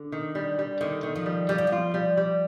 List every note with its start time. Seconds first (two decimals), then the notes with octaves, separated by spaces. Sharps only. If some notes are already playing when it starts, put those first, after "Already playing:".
Already playing: D3
0.12 D#3
0.35 G3
0.59 G3
0.81 D3 D#3
1.03 D#3
1.16 F3
1.26 G3
1.49 F3 G3
1.58 D#3
1.67 F3
1.72 F4
1.94 G3
2.17 G3